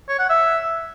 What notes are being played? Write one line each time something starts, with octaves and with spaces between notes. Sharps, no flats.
C#5
F#5
E5